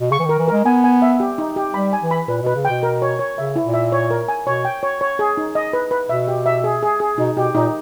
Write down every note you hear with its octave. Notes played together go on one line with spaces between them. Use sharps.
B2
C#3 C#6
E3
D#3 A#4
E3
G#3 A#4
B3 G#5
G#5
E5
G4
D#4
G4
G3 B5
G#5
E3
B5
A#2 B4
B2 B4
C#3
G5
B2
A#4
C#5
C#5
C#3 E5
E4
A#2
E5
C#5
A#4
G#5
B2 C#5
G5
C#5
C#5
G#4
D#4
D#5
B4
B4
B2 E5
G4
E5
G#4
G#4
G#4
B2 D#4
B2 G4
A#2 D#4